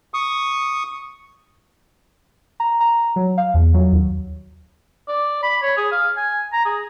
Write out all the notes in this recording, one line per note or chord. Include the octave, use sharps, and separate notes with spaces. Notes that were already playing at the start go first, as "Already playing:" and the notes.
C#6 D#6
A#5
A#5
F#3
F5
E2
F#3
D#2
D5
B5
C#5
G#4
F5
G#5
A#5
G#4